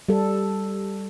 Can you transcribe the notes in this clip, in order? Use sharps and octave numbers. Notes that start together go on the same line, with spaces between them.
G3 A4